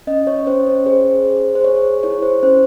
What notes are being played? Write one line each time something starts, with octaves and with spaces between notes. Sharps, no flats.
C#4 D#5
C#5
C#4 C5
C#5
G#4 C5
G#4
C5
G#4 C#5
E4 C#5
C5
C#4 C5